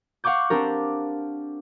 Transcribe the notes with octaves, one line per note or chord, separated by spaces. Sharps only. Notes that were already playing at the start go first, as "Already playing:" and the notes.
F5 F#5 C#6 D6 G6
C4 D4 G4 A#4